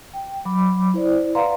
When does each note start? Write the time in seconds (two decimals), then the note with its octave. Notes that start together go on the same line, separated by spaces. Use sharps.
0.14 G5
0.45 F#3 B5 D6
0.94 E4 C5 D5
1.35 B4 D5 F5 F#5 A#5 C6